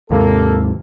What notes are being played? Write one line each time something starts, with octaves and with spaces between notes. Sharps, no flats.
D#2 G#2 C3 A#3 A4